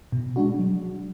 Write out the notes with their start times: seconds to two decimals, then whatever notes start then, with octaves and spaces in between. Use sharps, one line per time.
0.12 B2
0.36 G#3 D4 F#4
0.59 F#3